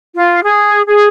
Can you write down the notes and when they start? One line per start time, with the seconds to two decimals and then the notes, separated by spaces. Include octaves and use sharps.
0.14 F4
0.42 G#4
0.86 G#4